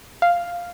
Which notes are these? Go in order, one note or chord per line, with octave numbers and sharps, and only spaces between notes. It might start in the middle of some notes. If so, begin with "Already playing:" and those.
F5